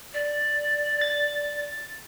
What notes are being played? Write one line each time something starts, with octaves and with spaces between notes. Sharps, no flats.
D5
A6